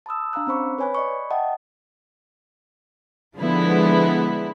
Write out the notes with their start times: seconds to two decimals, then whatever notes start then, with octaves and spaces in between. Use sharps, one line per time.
0.06 A5 B5 D#6 E6
0.33 D4 F5 A#5 E6 F#6
0.47 C4 C#4 C5 B5 C#6 D6
0.78 B4 C#5 G#5 B5 F#6
0.95 D5 D#5 B5 C#6
1.30 D#5 E5 F#5 G5 A5
3.39 D3 F3 G#3 B3 E4